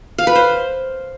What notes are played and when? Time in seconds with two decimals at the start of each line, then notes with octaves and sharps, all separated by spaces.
0.18 F5
0.27 B4
0.35 C5